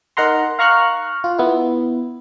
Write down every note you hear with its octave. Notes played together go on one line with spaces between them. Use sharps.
D#4 A#4 F#5 A#5 C6
F5 A#5 C#6 F6 F#6
F4
B3 E4